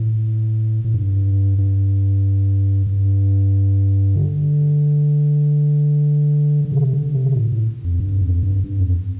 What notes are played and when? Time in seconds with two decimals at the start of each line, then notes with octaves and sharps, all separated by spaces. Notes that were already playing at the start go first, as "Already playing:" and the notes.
Already playing: A2
0.84 A2
0.94 G2
1.58 G2
2.87 G2
4.15 D3
6.65 D3
6.72 C3
6.93 D3
7.14 C3
7.36 A2
7.52 A2
7.84 F2
8.00 G2
8.21 F2
8.43 G2
8.64 G2
8.80 F2